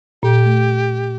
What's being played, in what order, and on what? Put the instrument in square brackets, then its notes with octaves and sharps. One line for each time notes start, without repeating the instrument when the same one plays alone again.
[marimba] A#2 [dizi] G4
[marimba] A3